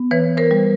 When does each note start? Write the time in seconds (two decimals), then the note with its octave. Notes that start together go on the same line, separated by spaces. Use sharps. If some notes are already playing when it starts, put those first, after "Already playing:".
Already playing: B3
0.11 E3 B4 C#5
0.37 A#4 C5
0.51 G3